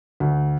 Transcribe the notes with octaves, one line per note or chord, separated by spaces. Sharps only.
D2